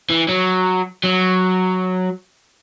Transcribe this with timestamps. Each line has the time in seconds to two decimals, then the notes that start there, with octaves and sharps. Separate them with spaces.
0.10 E3
0.29 F#3
1.03 F#3